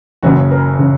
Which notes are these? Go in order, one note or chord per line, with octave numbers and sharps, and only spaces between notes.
F#1 F#2 C#3 F#4
A#4
C#3